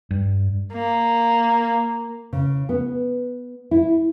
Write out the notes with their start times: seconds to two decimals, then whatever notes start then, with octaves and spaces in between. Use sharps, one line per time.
0.11 G2
0.74 A#3
2.33 C#3
2.69 B3
3.71 E4